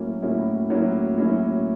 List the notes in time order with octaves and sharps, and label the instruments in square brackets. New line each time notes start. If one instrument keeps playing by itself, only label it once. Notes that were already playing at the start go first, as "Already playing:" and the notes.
Already playing: [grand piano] A2 F#3 A#3 C#4 E4
A2 F#3 A#3 C#4 E4
A2 F#3 A#3 C#4 E4
A2 F#3 A#3 C#4 E4